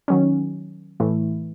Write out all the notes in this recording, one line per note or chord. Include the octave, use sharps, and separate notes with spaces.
D#3 F#3 C#4
A2 E3 A3 E4